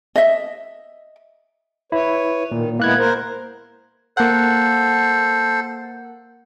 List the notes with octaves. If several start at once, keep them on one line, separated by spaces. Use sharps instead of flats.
D#5 E5
E4 B4 C#5
A#2 D#3
G#3 A#3 B3 E4 F#6 G#6
A#4 C5
A#3 A4 C5 F#5